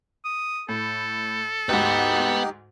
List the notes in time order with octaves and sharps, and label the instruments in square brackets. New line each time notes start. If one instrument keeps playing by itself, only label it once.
[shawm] D#6
[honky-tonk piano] A2 [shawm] A4
[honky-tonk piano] D2 G#2 [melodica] D#4 G4 [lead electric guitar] B4 F#5